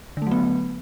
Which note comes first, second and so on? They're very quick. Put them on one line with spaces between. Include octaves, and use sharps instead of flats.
D3 A3 F#3 B3